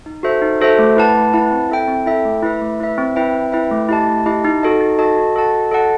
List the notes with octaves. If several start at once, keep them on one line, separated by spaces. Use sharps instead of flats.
D#4
F#4 A4 C5 E5
D#4
F#4 A4 C5 E5
A3
E4 B4 F#5 A5
A3
E4 B4 F#5 A5
C4
E4 A4 E5 G5
C4
E4 A4 E5 G5
A3
E4 B4 E5
A3
E4 B4 E5
C4
E4 B4 E5 G5
C4
E4 B4 E5 G5
A3
E4 G4 D#5 A5
A3
E4 G4 D#5 A5
D#4
F#4 A4 D#5 A5
D#4
F#4 A4 D#5 A5
F#4
A4 D#5 F#5 A5
F#4
A4 D#5 F#5 A5